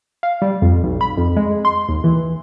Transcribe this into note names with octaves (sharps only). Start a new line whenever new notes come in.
F5
G3
F2
B1
B5
F2
G#3
C6
D#2
E3